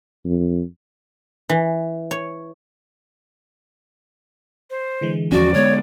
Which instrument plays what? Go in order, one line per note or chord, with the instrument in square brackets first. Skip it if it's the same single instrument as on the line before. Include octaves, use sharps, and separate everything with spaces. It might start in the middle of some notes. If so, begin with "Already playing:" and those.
[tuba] F2
[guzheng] E3
C#5
[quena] C5
[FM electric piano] D3 E3 G#3
[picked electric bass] E2 F3 C#4 [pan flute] F#4 [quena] D5
[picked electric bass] D3 G#3 B3 [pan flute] C#5 [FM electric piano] C#6